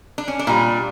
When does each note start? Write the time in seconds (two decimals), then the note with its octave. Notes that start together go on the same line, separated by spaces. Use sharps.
0.18 D4
0.28 C#4
0.39 D4
0.47 A#2 G3